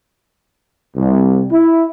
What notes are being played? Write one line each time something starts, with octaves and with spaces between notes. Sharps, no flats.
C2
E4